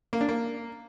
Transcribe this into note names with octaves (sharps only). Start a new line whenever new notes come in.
A#3
D4
A#3